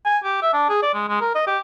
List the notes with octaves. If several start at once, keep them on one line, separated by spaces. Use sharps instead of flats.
G#5
G4
E5
D4
G#4
D5
G#3
G#3
A#4
D#5
G4